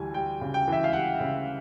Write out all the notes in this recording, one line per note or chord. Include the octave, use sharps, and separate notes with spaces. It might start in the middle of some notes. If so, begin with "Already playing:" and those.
Already playing: D2 E3 G3 G#5
G3 G5
C#3
G5
E3 E5
F5
G3 F#5
C#3